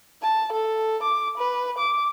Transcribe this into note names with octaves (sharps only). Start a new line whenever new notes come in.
A5
A4
D6
B4
D6